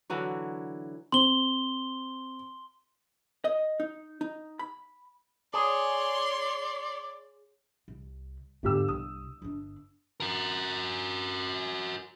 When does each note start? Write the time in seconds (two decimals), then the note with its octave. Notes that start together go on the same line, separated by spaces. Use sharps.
0.10 D3 E3 F#3 F#4
1.12 C4 C6 G7
3.45 D#5
3.80 D#4
4.21 D#4
4.59 B5
5.54 G#4 C#5 D5 C6
7.88 C2
8.63 G1 E2 G#2 G4 E6
8.88 C2 D#6
9.42 G1 D4
10.20 F#4 A#4